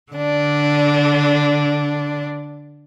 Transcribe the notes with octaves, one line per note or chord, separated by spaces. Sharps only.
D3 D4